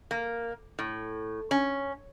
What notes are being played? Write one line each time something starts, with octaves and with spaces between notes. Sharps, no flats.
A#3
A2
C#4